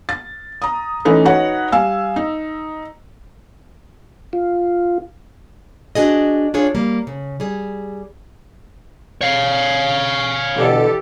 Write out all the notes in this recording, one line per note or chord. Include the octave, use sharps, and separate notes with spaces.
A6
A#5 D#6
E3 A3 C#4 D#4 A4 B4
D#4 F#4 B4 C#5 F#5
G3 F5 G#5 E6
D#4
F4
D4 F#4 G#4 D#5
D4 F4 G#4 C#5
G3 A#3
C#3
G3 G#4
C#5 F5
B2 D3 E3 G4 A4